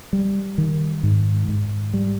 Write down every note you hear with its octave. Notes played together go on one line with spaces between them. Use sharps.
G3
D#3
G#2
G#2
G3